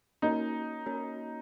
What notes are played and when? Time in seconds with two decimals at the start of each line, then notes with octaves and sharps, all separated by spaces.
0.22 A#3 C#4 D#4 F#4 A#4 C#5
0.86 A#3 C#4 F#4 A#4 C#5